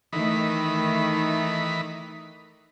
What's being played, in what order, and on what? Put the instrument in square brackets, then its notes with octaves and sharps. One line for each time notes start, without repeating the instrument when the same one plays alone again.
[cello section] D#3 A3 [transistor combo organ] E3 D#4 B5